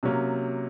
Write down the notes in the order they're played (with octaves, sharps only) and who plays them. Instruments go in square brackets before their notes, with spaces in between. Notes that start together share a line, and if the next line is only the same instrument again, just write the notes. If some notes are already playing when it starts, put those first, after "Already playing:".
[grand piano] C3 F#3 A#3 C#4